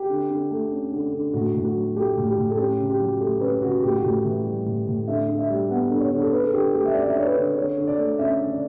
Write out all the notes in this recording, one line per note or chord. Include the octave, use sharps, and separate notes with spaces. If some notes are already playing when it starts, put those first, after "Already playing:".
Already playing: G4
D3
D3
A3
C#4
D3
D3
A2 F#4
A2
F#4
F#3
A3 G4
A2
G4
A2
A4
C#4 G4
C#3
G4
F#3
A3 G4
C#4 B4
C#3 F#4
A2 G4
F#4
A2 G4
E3
G3
A2
A2
D3 E5
D3
E5
G3
B3 F#5
D3
C#5
D3
A4
D3 B4
A4
D3 G4
A3 G4
E5
C#4 D5
E5
D5
D3 C#5
B4
D3
D3 C#5
D3
D5
A3
C#4 E5
D3
D5